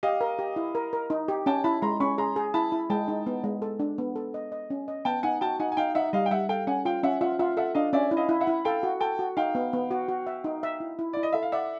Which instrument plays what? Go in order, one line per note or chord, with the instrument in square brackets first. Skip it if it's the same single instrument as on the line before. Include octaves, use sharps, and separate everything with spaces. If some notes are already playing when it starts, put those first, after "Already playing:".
[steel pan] G4 [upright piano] D#5 F5
[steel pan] A#4
G4
E4
A#4
A#4
D#4
G4
[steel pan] C#4 [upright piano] G5 A5
[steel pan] E4 [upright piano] A5 B5
[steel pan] G#3 [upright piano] A#5 C6
[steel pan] C#4 [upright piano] B5 C#6
[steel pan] G#4 [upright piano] A#5 C6
[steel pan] G#4
[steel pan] E4 [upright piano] A5 B5
[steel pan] E4
[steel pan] G#3 [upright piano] G5 A5
[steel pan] D#4
B3
G#3
A4
D4
B3
A4
D#5
D#5
C#4
D#5
[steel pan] B3 [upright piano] G5 A5
[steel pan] D#4 [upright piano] F#5 G#5
[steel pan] F#4 [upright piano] G5 A5
[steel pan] D#4 [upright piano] F#5 G#5
[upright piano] G#5
[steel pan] D#4 [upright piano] F5 G5
[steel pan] D#4 [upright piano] E5 F#5
[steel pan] G3 [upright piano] D#5 F5
[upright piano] G5
[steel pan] G3 [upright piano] E5 F#5
[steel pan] A4 [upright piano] F5 G5
[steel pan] C#4 [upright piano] F#5 G#5
[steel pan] F4 [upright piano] F5 G5
[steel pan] C#4 [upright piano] E5 F#5
[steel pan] F4 [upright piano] E5 F#5
[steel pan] F4 [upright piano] E5 F#5
[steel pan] A4 [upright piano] E5 F#5
[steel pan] D4 [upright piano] D#5 F5
[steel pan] C#4 [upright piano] D5 E5
[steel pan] E4
[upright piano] D#5 F5
[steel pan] E4
[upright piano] E5 F#5
[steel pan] E4
[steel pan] A4 [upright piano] F5 G5
[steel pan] F#4
[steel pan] A4 [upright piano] G5 A5
[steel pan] F#4
[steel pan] D#4 [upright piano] F5 G5
[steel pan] B3
B3
F#4
F#4
E5
D#4
E5
E4
E4
[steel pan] E4 [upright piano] D5
[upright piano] D#5
[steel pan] A4 [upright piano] E5
[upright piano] F5
[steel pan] D5 [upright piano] E5 F#5